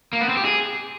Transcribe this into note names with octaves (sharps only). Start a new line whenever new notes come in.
A#3
B3
C4
G4
G#4